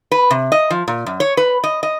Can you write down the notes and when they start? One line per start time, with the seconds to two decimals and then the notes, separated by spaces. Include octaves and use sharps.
0.12 B4
0.31 C3
0.52 D#5
0.70 F3
0.88 A#2
1.06 F#2
1.20 C#5
1.37 B4
1.64 D#5
1.83 D#5